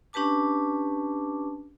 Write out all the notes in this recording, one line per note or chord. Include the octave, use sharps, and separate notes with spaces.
C#4 D4 G4 B4 A5 D6